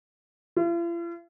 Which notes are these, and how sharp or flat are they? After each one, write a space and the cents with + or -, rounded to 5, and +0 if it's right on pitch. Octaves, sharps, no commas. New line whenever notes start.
F4 -45